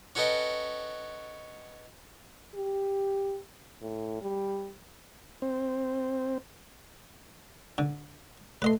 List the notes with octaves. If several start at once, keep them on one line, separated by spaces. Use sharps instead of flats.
C#4 F#4 A4 B4 D#5 G5
G4
A2
G3
C4
D3
A3 B4 D#5 C6